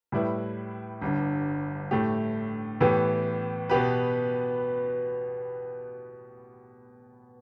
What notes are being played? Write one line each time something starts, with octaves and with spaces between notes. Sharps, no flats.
A2 G3 E4 B4
G1 G2 D3
A2 A3 G4
A2 E3 B3 G4
B2 B3 G4 B4